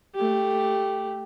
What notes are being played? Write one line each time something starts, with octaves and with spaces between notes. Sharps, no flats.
A3 G4